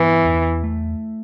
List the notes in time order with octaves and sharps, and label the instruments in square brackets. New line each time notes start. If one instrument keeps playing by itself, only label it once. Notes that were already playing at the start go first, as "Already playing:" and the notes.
Already playing: [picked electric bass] G2 B3 [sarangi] E3
[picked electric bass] E2
A3